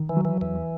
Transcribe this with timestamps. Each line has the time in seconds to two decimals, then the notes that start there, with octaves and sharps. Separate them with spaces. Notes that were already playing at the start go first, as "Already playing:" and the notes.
Already playing: D#3
0.09 E3
0.17 F#3
0.25 E3
0.41 E2 E3